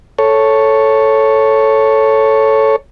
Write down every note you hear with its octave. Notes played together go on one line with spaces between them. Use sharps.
A4 C#5